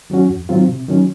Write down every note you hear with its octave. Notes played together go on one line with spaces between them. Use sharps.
D#3 F#3 C#4 F#4
F2
D#3 F#3 C4 F4
C3
D#3 F#3 C#4